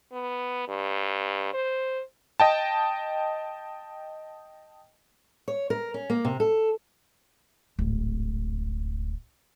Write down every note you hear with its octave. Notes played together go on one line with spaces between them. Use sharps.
B3
G2
C5
D#5 G5 A5
C#5
A#4
C#4
A#3
C3
A4
D1 G#1